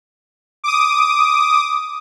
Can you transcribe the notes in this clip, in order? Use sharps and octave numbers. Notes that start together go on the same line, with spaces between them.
D6 D#6